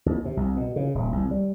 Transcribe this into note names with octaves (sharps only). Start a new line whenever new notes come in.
D#2
C3
C2
B2
C#3
D#1
C2
G3